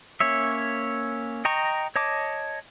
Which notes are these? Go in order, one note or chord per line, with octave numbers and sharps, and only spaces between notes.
A#3 C#4 C#5 E5
D#5 G5 A#5 C#6
C#5 D#5 A5 D6